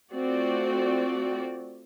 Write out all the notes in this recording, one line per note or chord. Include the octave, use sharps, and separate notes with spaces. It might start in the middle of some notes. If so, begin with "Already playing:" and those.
A3 C4 F4 F#4 D5